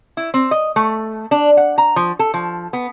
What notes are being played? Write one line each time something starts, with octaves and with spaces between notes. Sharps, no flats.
E4
C4
D#5
A3
D4
F#5
A#5
F3
A4
F3
B3